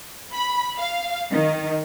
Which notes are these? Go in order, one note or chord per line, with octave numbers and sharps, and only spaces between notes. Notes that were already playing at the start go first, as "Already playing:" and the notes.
B5
F5
D#3